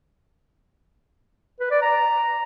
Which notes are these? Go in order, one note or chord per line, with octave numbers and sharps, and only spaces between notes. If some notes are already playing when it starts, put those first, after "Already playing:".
B4
D5
A#5